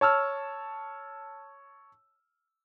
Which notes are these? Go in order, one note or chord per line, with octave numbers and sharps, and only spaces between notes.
C#5 A5 E6 F6